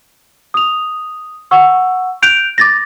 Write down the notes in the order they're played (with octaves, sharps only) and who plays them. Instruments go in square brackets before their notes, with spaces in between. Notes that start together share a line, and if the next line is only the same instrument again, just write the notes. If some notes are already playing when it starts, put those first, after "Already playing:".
[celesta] D#6 F7
F#5 C#6 E6
F#6 G6 D7 F7
D6 A6 A#6